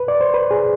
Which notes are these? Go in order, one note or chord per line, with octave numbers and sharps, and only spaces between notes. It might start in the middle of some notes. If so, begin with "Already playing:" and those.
Already playing: B4
D5
C5
B4
G#4